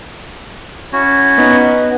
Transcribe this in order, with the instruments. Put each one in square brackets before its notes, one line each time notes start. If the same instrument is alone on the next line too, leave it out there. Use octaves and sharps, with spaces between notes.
[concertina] C#4 E4 F#4
[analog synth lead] B3 [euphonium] D#4